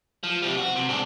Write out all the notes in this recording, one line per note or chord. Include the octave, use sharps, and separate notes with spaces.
F3
C3 G3
F#4
C3
G#2 D4